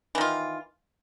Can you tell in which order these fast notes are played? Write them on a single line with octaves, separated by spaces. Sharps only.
E3 D#3 F4